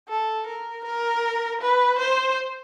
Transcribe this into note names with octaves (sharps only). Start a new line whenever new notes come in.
A4
A#4
A#4
B4
C5